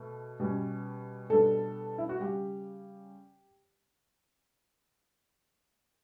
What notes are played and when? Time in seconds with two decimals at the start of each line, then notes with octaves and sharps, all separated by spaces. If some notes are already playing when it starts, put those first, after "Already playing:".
Already playing: B2 A3
0.40 B2 G3 C#4
1.30 B2 G3 B3 D4 A4
1.98 E4
2.09 F#4
2.20 C#3 G3 C#4 G4